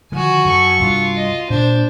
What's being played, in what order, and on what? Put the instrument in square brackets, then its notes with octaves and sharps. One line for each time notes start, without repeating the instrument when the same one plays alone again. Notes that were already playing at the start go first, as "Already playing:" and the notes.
[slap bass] D3 D#3 F3 [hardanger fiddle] F#4 G#5
[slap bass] F#2 [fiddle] A4 C#6
[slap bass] C2 G2 D4 [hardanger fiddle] F4
[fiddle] D#5
[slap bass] A#2 [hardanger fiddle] D4 [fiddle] C5